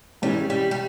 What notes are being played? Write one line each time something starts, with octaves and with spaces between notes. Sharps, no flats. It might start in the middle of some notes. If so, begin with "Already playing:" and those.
G#2 E3 G3 G#3 C#4 E4
G3
G3